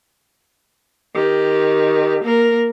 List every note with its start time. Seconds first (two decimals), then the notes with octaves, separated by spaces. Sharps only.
1.14 D#3 G4
2.24 A#3 A#4